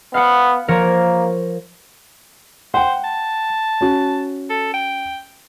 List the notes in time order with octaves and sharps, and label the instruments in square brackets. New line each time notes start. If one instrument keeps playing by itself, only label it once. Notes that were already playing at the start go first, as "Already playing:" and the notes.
[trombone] B3 [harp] F5 F#5
[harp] F3 A#4 C#5 [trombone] A#3
[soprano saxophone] C5 [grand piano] F#5 G5
[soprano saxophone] A5
[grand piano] C#4 F#4
[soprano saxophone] A4
G5